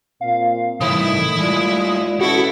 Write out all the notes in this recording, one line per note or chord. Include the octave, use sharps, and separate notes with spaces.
A#2 C4 F5
C2 A2 D#3 E3 E4 D#6
D#2 G#3 A3 F4 D5
E2 B2 C#4 E4 F#4 A4 F#5